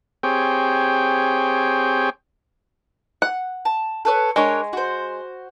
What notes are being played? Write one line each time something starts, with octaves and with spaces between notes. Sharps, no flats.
C4 G4 G#4 C#5 G5
F#5
A5
A4 B4 C#5
G#3 D4 A#4 C#5
F#4 C5